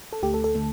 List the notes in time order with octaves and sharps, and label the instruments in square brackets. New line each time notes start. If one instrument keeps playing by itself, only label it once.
[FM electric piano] A4
D2 D3 A3 G4
A4
A4
D3 A3